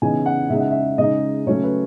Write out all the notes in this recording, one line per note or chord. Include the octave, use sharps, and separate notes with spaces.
C#3 E3 B3 D#4 G#5
F#5
C#3 G#3 D#4 E5
F#5
E5
C#3 G#3 D#4 D#5
C#3 F#3 A3 C#4 C#5
B4